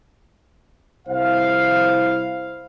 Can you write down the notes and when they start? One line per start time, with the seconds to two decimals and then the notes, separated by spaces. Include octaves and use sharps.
1.08 C2 E4 C5 F5